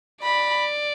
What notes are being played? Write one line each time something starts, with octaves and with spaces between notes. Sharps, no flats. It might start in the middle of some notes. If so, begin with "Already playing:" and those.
D5 B5